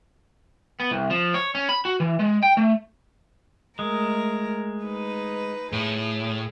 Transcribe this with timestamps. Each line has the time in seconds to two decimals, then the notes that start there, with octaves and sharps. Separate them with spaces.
0.80 B3
0.91 C2
1.10 F3
1.34 C#5
1.55 C#4
1.69 B5
1.85 F#4
2.00 E3
2.19 G#3
2.43 G5
2.57 A3
3.79 G#3 A3 A#4
4.84 D#4 B4
5.72 A2 G#4